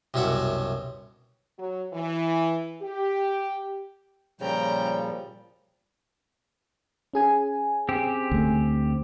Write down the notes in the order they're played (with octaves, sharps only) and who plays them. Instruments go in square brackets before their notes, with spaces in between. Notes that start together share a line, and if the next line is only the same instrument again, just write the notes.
[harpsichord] C2 F#2 B2 E5 F#5 D6
[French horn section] F#3
E3
G4
[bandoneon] A#2 F3 G3 [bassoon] C#3 [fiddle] G5 A#5
[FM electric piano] C#4 G#4 G#5
[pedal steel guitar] C4 G4
[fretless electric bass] D2 A3